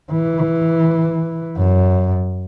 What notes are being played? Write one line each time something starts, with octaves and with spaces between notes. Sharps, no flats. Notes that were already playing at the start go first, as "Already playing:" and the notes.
E3
F#2